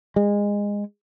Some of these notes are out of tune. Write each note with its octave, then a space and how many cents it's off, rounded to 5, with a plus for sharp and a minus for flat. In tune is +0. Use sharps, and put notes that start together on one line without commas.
G#3 -20